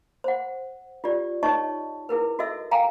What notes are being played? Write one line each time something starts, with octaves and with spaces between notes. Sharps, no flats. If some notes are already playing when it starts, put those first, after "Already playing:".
C5 F#5
F4 G4 D5
D#4 C#5 D#5 A5 C#6
E4 G#4 A#4 B4
F#4 A4 D#5 E5 E6
F5 G5 G#5 A#5